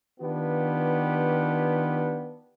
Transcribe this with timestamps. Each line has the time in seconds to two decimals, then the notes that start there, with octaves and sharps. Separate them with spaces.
0.20 D#3 B3 D4 F4 G4 B4